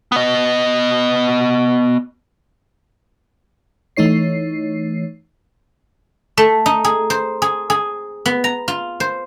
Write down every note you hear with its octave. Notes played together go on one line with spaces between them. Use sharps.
B3 D#5
E3 A3 D#4 C#5 C7
A3
D#4
G#4
C5
G#4
G#4
B3
A#5
F4
C5